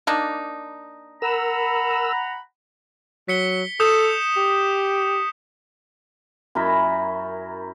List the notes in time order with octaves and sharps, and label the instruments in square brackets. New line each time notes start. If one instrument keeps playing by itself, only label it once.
[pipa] A#3 D4 D#4
[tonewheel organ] A#4 E6 [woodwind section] F#5 A#5 B5
[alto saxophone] F#3 [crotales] B6 C#7 G7
[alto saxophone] A4 [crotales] D#6 G6 E7
[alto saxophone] G4
[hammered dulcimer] F#2 E4 A#4 B5